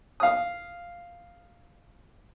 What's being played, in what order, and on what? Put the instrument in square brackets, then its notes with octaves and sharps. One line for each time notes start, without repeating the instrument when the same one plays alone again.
[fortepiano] F5 D#6